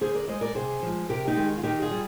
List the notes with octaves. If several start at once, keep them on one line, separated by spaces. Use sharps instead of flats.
D3 G#4 C5
A#4 D5
G#3 C5 D#5
A#4 D5
C3 G#4 C5
F3 G#3
C3 G4 A#4
D#4 G4
D#3 G#3
F4
D#3 D#4 G4
F4 G#4
G3